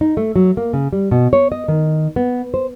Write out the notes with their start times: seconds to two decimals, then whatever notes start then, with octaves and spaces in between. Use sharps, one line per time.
0.01 D#4
0.17 A3
0.36 F#3
0.57 A#3
0.73 C#3
0.93 G3
1.11 B2
1.33 C#5
1.52 D#5
1.68 D#3
2.16 B3
2.54 C5